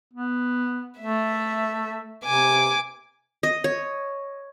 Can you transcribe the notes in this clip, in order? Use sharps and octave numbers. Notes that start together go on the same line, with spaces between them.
B3
A3 E5
C3 G#5 D6
D#5
C#5